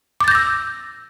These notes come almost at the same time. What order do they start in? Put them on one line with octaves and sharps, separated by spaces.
D6 A6 G6 A#6 E6